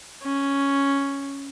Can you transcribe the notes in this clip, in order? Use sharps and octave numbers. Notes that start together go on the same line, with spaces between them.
C#4